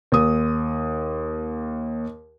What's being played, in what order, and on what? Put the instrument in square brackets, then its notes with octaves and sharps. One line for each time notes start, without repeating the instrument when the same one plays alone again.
[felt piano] D#2 D#6